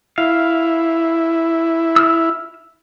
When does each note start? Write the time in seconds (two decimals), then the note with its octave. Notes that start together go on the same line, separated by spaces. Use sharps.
0.18 E4 F5
1.96 E6 F6